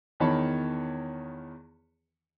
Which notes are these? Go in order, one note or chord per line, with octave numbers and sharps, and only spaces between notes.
E2 D#3 C#5 A5 B5